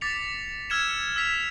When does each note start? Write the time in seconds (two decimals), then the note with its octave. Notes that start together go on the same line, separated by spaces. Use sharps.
0.01 D6 A6 B6 C#7 F7
0.70 E6 F6 G#6 C#7 E7
1.16 E6 B6 F7